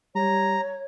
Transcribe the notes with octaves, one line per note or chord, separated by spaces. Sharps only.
G3 C#5 A#5